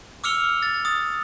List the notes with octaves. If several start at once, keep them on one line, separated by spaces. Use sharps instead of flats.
D6 E6 F6 C#7 F7 G7
A6
D#6 A6